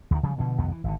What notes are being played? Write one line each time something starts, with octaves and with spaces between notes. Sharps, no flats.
D2 D#3
C#3 F3 G3
B2 D3 F3
C2 F2 D#3 B3
E3
G#1 D3